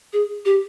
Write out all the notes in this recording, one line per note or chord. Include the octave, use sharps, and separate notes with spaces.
G#4
G4